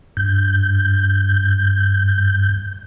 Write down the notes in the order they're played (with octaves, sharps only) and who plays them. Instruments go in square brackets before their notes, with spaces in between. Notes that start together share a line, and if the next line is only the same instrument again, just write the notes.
[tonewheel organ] G2 G6